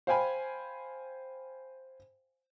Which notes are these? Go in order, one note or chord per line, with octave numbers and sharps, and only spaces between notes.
C5 F5 G5 G#5 B5